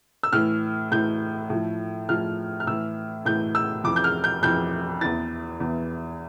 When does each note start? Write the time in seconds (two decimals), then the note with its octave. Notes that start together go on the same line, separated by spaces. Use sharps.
0.23 E6
0.33 A2 E3 F6
0.92 A2 E3 G6
1.50 A2 F3
2.09 A2 F3 F6
2.60 F6
2.67 A2 E3 E6
3.25 A2 E3 G6
3.55 E6
3.84 F2 E3 D6
3.96 G6
4.04 F6
4.24 G6
4.43 F2 E3 G6
5.01 E2 E3 A6
5.60 E2 E3